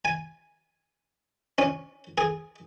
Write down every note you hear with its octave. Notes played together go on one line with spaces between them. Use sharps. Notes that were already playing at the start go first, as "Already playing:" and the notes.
G#5
C#4
G#4